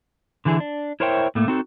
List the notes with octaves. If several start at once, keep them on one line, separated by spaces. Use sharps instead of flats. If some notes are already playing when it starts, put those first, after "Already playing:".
D3 E3 E4 G#4
D4
E4 A#4 C5 C#5 E5 G5
A2 A3 A#3
C4 D#4 F#4 A4